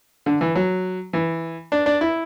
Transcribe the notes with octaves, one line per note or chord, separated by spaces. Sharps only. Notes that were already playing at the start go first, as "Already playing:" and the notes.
D3
E3
F#3
E3
D4
D4
E4